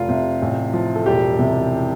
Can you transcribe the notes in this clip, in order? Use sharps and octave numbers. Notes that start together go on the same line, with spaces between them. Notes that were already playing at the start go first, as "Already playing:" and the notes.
Already playing: F1 F4
C3
A1
F3
A4
E1 G4
C3